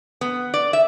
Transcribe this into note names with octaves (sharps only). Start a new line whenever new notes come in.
B3
D5
E5